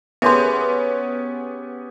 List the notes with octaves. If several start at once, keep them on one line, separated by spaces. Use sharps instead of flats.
B3 C#4 G4 G#4 B4 E5 C6